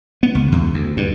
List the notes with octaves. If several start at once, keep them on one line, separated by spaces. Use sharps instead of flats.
B3
C#2
E2
D2
G2